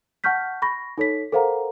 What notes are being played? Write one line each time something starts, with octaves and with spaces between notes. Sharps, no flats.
F#5 A5 C#6 F6 G6 B6
B5 C#6 A#6
D#4 A4 C#5 B6
A4 A#4 C5 F5 F#5 A#5